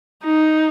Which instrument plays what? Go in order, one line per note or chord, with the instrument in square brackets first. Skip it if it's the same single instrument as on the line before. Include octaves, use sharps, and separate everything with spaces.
[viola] D#4